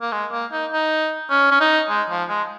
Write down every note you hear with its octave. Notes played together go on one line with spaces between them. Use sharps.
A#3
G#3
A#3
D#4
D#4
C#4
C#4
D#4
G#3
F3
G#3